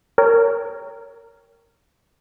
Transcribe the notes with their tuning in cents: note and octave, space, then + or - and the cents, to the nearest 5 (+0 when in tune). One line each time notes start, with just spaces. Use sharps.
A#4 -10 C#5 +25 G5 +0